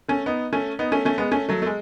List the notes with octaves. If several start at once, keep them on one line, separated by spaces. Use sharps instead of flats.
A3 C#4
B3 D#4
A3 C#4
B3 D#4
A3 C#4
A3 C#4
G#3 B3
A3 C#4
F#3 A3
A3
G#3